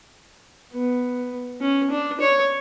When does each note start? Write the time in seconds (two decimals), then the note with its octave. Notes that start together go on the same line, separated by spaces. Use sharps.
0.72 B3
1.61 C#4
1.90 D4
2.20 C#5